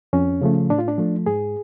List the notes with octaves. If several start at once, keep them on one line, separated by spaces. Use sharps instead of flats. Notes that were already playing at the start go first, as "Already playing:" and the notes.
F2 C#4
C#3 F3 A3
A2 D4
F4
D4
F3 A3
G#2 G#4